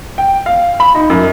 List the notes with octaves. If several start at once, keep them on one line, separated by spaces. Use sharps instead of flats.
G5
F5
B5
D#4
F#2